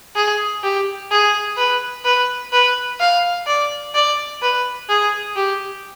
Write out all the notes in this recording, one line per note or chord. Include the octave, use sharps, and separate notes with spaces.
G#4
G4
G#4
B4
B4
B4
F5
D5
D5
B4
G#4
G4